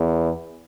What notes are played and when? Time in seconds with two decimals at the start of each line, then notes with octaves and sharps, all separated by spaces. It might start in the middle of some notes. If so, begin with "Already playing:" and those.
Already playing: E2